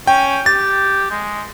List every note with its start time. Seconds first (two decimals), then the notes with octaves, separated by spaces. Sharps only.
0.07 C#4 G5
0.46 G4 A6
1.11 G#3